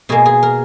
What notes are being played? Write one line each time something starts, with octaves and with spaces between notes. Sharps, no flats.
B2 A#3 G#4
G#4
A#4